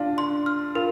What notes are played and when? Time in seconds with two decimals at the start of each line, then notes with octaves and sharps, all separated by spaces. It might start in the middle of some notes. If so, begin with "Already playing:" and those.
Already playing: D4 F4 F5
0.18 C6
0.46 F6
0.75 F4 A#4